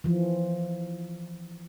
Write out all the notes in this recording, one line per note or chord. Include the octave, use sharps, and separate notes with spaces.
E3 F3